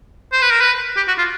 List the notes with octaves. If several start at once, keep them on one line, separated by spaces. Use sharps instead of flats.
C5
B4
A#4
B4
G4
F#4
F4